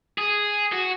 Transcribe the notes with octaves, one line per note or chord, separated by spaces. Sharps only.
G#4
F#4